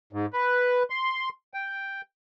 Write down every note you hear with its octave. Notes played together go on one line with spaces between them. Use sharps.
G#2
B4
C6
G5